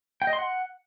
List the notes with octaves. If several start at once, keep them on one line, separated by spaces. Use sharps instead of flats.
G5
D#5
C6
F#5